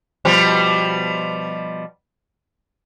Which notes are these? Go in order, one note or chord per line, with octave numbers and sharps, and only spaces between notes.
B2 F3 G3